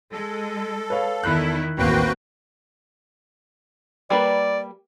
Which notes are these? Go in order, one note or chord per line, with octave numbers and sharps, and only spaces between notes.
G#3 A4
B4 C#5 F5
E2 D#3 E4 B5 F#6
A1 D#2 A#3 C4 F#4 B4 G5
G3 A#3 B4 D5